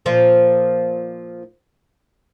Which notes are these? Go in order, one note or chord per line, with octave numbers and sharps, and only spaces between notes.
A#2 F3 F4